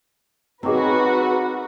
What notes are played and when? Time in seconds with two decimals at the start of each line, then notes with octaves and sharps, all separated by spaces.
0.63 F#3 C4 D#4 F#4 G#4 A#4 B4 D6